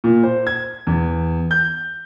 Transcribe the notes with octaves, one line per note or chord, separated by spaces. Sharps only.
A#2
C5
G#6
E2
G6